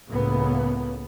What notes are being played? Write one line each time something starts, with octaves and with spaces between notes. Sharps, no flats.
C#2 A2 C#3 A#3 B3